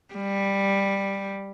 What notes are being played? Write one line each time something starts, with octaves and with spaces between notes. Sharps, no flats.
G3